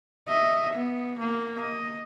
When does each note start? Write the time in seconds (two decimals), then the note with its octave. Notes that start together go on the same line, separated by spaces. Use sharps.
0.28 D#5 E5
0.73 B3
1.19 A#3
1.58 D#5